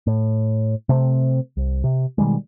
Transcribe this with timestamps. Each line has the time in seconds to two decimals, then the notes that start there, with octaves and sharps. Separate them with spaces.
0.07 A2
0.89 C3 A3 C4
1.57 C2
1.84 C3
2.18 B2 D#3 G3 G#3